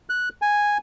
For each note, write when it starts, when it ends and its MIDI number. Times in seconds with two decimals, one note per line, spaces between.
0.10 0.29 90
0.42 0.78 80